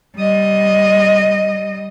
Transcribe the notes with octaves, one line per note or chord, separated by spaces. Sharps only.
G3 D#5